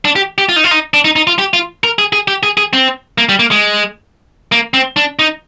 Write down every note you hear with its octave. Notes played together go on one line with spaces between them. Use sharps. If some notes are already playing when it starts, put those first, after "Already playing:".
D4
G4
G4
F4
D#4
F4
D#4
D4
D#4
D#4
F4
G4
F4
A#4
G#4
G#4
G4
G#4
G#4
C4
A#3
G3
A#3
G#3
A#3
C4
D4
D#4